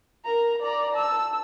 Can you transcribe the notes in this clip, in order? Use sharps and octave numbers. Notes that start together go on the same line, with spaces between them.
A#4 A#5
D5 A#5
A5 E6